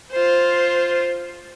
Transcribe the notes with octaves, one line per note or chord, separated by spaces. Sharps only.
F4 C5